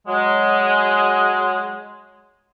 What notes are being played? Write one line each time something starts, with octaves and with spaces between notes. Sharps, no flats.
F#3 G#3